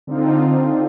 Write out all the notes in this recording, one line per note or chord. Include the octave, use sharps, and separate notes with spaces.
D3 C4 D#4 F4